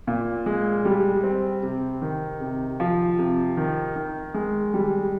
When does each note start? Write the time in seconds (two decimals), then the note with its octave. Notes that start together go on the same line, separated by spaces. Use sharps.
0.07 A#2
0.46 G#3
0.85 G3
1.23 C4
1.63 C3
2.02 D#3
2.41 C3
2.80 F3
3.19 C3
3.57 D#3
3.96 D#3
4.34 G#3
4.74 G3